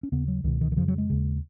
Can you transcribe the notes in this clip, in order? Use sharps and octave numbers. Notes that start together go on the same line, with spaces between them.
C#4
D#2 C#3 B3
F#3
C#2 B2 D#3
D#3
D#3
F2 C#3 F3
F#3
G#3
D#2 C#3